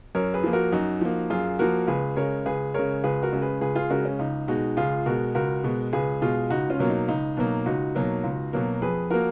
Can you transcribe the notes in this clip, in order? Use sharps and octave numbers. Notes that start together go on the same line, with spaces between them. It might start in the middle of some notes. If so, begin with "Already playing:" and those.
F#2 A#4 C#5
G#4 B4
F3 A#3
F#4 A#4
F#2 D#4 F#4
F3 A#3
F#2 F4 G#4
F3 A#3 F#4 A#4
C#2 G#4 B4
C#3 G#3 A#4 C#5
C#2 G#4 B4
C#3 G#3 A#4 C#5
C#2 G#4 B4
F#4 A#4
C#3 G#3
G#4 B4
C#2 G#4 B4
F4 G#4
C#3 G#3 F#4 A#4
C#4
C#2 D#4
B2 G#3 D#4 F#4
C#2 F4 G#4
B2 G#3 F#4 A#4
C#2 F#4 A#4
B2 G#3
C#2 G#4 B4
B2 G#3 F4 G#4
C#2 D#4 F#4
C#4 F4
B2 F#3 A#3
D#4
C#2 D#4
B2 F#3 A#3
C#2 D#4 F#4
B2 F#3 A#3
C#2
B2 F#3 A#3
F2 G#4 B4
F3 A#3 F#4 A#4